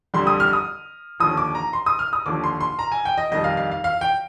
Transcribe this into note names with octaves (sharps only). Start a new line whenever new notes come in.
F2 D3 G3 C6
D#6
F6
D#6
D#2 D3 F3 D#6
D6
A#5
C6
D#6
F6
D#6
D#2 D3 F3 D6
C6
C6
A#5
G#5
G5
D#5
F2 D#3 G3 D#5
F5
F5
F5
F5
G5